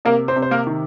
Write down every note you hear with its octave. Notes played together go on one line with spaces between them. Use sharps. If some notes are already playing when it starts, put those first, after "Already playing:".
C3 A#3 A#4
C4 C5
C3
C5
A#3 A#4
D#3